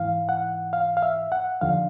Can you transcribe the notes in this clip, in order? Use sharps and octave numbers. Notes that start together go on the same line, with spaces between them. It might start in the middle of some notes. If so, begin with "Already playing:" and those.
Already playing: G#2 E3 F5
F#5
F5
F5
E5
F#5
D#2 D3 F3 F5